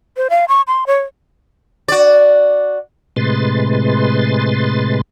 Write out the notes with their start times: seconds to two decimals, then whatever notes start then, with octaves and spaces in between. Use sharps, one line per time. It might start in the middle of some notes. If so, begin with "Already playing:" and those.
0.17 C5
0.30 F5
0.48 C#6
0.68 C6
0.87 C#5
1.88 F#4 D5
3.16 A2 C3 G#3 B4 C6 A6